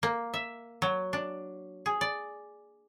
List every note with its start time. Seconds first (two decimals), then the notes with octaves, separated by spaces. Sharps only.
0.03 A#3
0.34 E5
0.82 F#3
1.13 D4
1.86 G#4
2.01 D5